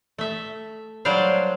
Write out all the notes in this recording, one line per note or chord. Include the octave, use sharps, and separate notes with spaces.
A3 E5
F#3 G3 D4 C5 D5 F5